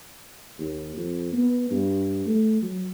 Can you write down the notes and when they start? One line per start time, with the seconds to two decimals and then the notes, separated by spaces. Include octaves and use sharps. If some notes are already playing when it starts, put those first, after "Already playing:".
0.59 D#2
0.96 F2
1.32 B3
1.70 G2
2.26 A3
2.62 F#3